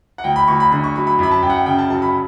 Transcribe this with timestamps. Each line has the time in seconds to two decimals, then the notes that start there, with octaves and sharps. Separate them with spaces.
0.18 F#5
0.24 D2 G5
0.36 B5
0.48 D2 C#6
0.60 B5
0.72 D3 B5
0.84 C#6
0.96 F#3 B5
1.07 B5
1.19 F#2 B5
1.31 A5
1.43 F#2 G5
1.50 F#5
1.55 G5
1.66 C#3 G5
1.78 A5
1.90 F#3 A5
2.02 B5